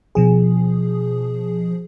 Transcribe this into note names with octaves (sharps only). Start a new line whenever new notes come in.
B2 F3 G#4